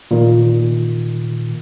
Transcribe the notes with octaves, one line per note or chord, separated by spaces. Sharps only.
A#2 D#3